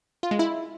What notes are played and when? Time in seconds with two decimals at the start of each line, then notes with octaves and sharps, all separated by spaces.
0.23 F4
0.31 G#3
0.39 E4